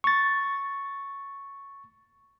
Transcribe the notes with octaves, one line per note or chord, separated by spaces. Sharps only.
C#6 A6